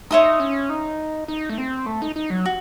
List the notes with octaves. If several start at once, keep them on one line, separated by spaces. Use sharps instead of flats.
D#4 C#5 E5 C6 D#6
C#4
D#4
D#4
A3
C4
A3
D#4
D#4
F#3
F#4